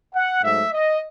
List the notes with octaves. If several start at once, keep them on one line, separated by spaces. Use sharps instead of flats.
F#5
G#2 F#3 A3 E5
D#5